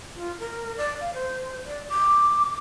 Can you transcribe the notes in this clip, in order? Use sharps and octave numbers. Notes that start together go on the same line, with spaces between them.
F4
A#4
D5
F5
C5
D5
D6